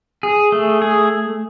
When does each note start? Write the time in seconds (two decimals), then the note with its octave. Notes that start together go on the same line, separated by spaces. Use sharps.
0.23 G#4
0.52 A3
0.82 G#4